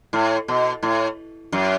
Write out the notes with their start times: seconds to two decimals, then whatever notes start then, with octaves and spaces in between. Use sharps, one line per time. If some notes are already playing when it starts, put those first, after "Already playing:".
0.13 A2
0.48 B2
0.83 A2
1.52 F#2